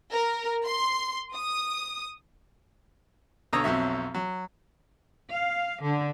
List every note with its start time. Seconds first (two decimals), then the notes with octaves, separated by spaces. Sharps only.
0.11 A#4
0.65 C6
1.35 D#6
3.53 B1 D3 C#5 A#5 D#6 E6
3.64 B1 F2 F#3 E5
4.15 F#3
5.31 F5
5.83 D3